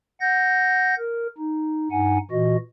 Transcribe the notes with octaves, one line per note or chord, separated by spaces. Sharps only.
F#5 G6 A#6
A#4
D#4
G2 D#4 F#5 G#5
A#2 E3 F#4 D#5